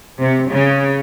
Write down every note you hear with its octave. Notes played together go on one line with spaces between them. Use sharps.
C3
C#3